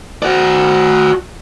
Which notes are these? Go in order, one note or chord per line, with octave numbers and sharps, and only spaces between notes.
F#4 D5